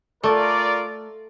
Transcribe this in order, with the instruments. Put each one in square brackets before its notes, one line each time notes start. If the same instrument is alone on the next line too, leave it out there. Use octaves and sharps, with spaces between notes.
[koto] A3 [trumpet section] F4 A#4 D5